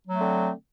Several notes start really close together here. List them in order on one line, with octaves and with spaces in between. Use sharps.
F#3 A3 C4 D3